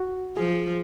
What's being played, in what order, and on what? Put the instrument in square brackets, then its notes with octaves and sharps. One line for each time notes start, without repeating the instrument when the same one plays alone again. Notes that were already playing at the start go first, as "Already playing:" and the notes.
Already playing: [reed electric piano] F#4
[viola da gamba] F3 [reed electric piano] G#4